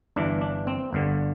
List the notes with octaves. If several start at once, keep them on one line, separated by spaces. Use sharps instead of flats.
G1 G2 E3 D4
D4
C4
G1 G2 D3